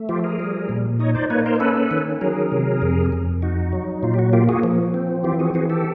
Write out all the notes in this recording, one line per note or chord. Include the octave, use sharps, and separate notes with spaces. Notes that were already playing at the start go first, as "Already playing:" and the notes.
Already playing: A3
F3 F4 G4
G#4 A#4
G3
A#2
D#4 C#5 D#5
C5 D5
A#3 B4 C#5
A#4 C5
C#4 A4 B4
D#3
F#3 G#4 A#4
C3
F2
F2
D#4 F#4
F#3
A#2 F4
G4
F#4
A#3 F4 G4
F#4 G#4
F3
C4
E3 F4 G4
F#4 G#4
E3 F#4 G#4
G4 A4